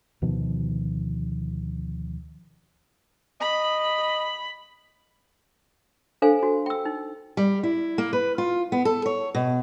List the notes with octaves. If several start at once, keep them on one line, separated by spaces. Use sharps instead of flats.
D2 B2 D#3 F3
D#5 B5
D4 A4 C5 F5 G#5
F#4
G5 E6
D#4
G3
E4
A#3
B4
F4
B3
A4
C#5
B2